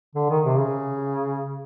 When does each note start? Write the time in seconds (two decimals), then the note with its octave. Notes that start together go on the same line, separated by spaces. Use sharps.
0.15 D3
0.29 D#3
0.44 C3
0.58 C#3